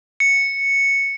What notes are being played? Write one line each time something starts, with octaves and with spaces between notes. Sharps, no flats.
C#7